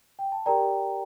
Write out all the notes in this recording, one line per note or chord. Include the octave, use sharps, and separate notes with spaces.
G5
A5
G4 A#4 D5 G5 A#5